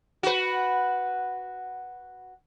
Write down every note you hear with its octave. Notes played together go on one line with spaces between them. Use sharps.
F#4 B4